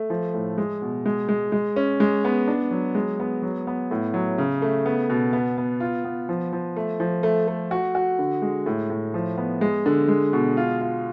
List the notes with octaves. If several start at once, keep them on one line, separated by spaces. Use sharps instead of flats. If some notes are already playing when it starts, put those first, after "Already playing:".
Already playing: A3
F3
A2
G#3
B2
G#3
G#3
G#3
C#4
G#3
B3
D4
F#3
G#3
B3
F#3
B3
A2
F#3
C#3
A3
B3
B2
B3
B3
F4
B3
F3
F3
A3
F3
A3
A3
F#4
F#4
D3
G#3
A2
A2
F3
B3
G#3
D3
G#3
B2
F4
F4